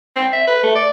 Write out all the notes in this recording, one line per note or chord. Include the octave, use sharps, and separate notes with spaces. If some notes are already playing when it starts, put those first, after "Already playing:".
C4
E5
B4
A3
D5